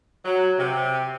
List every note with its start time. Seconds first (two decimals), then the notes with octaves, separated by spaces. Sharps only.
0.25 F#3
0.59 C3